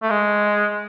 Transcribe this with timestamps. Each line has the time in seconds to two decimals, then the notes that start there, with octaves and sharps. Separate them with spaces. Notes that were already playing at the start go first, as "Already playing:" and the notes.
0.02 A3
0.10 G#3